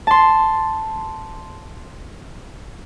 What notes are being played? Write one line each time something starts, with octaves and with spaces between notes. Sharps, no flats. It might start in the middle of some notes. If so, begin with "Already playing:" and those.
A5 C6